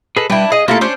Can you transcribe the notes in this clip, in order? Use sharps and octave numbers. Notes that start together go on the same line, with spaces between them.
G#4 A4 B4 D#5
G3 D4 E4 B4 G5
G#4 D#5
A3 A#3 E4 F4 G4 A4
C#4 D4 C5